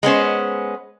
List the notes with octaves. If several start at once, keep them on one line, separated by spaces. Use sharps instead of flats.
G#3 B3 C#4 C5